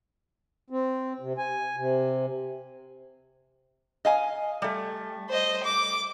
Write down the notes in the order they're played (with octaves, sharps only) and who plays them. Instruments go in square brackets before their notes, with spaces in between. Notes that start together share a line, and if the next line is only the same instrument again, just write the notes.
[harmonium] C4
C3
G#5
C3
[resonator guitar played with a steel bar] D#5 F5 G#5
G3 A3
[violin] C5 D#5
D6